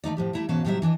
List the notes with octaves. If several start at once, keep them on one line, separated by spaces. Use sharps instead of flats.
D#3 A3 D#4 D5
A2 F3 G4
G3 A3 E4 A#4 E5
G#2 B2 E3 C#4 F5 A5
A2 C3 F#3 G3 C5 E5
E3 D4 D5 D#5